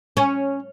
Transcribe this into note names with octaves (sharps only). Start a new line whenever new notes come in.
C#4